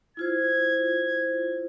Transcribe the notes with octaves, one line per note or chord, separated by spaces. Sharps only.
E4 F4 C5 G#6